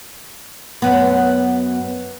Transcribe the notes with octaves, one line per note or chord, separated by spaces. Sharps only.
F#2 B3